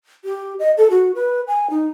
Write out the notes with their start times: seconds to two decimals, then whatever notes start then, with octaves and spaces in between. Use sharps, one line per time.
0.24 G4
0.59 D#5
0.77 A4
0.90 F#4
1.15 B4
1.47 G#5
1.70 D#4